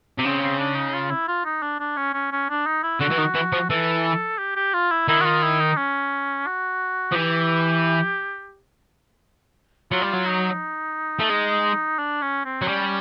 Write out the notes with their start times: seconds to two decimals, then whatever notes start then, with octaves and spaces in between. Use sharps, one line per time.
0.18 C3
0.25 C#3 C4
0.42 C4
0.59 D4
0.76 D#4
0.94 F4
1.11 E4
1.28 F4
1.45 D#4
1.63 D4
1.80 D4
1.97 C#4
2.14 C#4
2.32 C#4
2.50 D4
2.67 D#4
2.83 E4
3.01 D3 F#4
3.11 E3
3.18 D#3
3.35 E3
3.53 F3
3.70 E3 A4
4.38 G4
4.56 G4
4.74 F4
4.91 E4
5.08 D#3 E4
5.21 F#4
5.25 F4
5.43 E4
5.61 D#4
5.77 C#4
6.47 F#4
7.12 F3
7.15 E3 G4
9.92 F#3 F4
10.02 G3
10.13 F#3
10.27 D#4
11.20 A3
11.30 G#3
11.99 D4
12.22 C#4
12.45 C4
12.62 F#3
12.68 G3 C#4